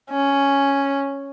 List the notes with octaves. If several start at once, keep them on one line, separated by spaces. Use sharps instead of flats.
C#4